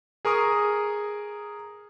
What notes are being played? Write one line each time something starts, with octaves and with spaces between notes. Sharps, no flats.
G#4 A#4 C#6 D#6